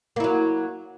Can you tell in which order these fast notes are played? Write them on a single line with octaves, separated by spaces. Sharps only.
A#3 E4 F#3